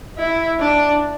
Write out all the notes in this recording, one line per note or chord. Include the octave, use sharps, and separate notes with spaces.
E4
D4